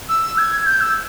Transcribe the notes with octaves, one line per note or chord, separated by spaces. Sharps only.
E6
G#6
G6
E6